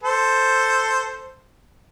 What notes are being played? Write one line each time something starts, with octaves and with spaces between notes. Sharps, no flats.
A4 C5